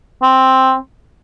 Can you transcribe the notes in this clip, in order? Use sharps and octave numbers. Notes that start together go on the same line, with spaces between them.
C4